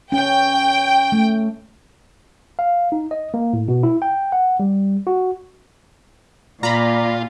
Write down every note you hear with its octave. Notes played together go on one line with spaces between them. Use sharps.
C#4 G5
A3
F5
D#4
D#5
A#3
A2
B2
E4
G5
F#5
G3
F#4
A#2 F4 D5 A#5 B5